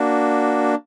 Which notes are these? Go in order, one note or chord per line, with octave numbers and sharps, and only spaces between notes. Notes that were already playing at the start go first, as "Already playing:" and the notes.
Already playing: A#3 D4 F#4